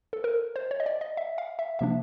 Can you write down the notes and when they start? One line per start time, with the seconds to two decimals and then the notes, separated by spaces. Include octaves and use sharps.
0.13 A4
0.24 A#4
0.56 C5
0.71 C#5
0.80 D#5
0.86 D5
1.01 D#5
1.17 E5
1.38 F5
1.59 E5
1.79 C3 F3 A#3 D4 E5